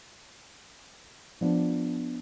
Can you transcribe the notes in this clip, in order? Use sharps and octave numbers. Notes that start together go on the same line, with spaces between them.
F3 B3 D4